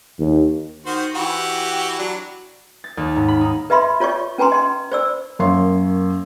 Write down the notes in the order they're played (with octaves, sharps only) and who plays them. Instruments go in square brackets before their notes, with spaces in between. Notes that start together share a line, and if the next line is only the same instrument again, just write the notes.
[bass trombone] D#2
[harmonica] D#3 F#4 C5
E3 F#4 G4
F#3 D4
[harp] A6
D#2
G#2
B5
D#4
[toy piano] B4 D#5 E5 B5 C6
F4 C#5 D5 C#6
C#4 B4 G#5 A#5 C6
D#5 C6
C5 D5 E6
[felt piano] F#2 A#3 C#5 C6